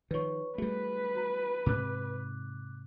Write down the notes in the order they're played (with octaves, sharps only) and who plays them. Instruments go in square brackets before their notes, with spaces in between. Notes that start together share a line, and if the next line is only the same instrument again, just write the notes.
[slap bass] D#3 F3 [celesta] B4 C#5 C#6
[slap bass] G3 A3 [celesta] F#4 G#4 [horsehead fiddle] B4
[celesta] F#4 A#5
[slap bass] G#2 C3 [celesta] D6 F#6